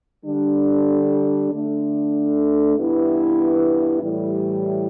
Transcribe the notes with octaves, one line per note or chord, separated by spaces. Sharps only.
D3 G3 D4
D3 A3 D4
G2 E3 B3 E4
A2 E3 G3